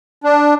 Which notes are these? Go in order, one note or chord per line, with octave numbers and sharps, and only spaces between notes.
D4